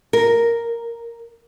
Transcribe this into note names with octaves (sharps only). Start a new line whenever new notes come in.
A#4